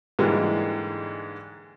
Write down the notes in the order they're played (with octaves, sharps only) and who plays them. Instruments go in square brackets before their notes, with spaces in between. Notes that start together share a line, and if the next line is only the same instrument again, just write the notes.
[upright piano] G#2 D3 E3 G3 G#3 A#3